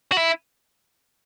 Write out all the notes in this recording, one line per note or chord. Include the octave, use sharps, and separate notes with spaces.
F#4
E4